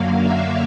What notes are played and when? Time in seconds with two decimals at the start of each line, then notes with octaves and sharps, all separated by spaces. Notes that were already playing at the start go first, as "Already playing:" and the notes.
Already playing: F#2 D3 F#3 A#3 F5
0.19 E5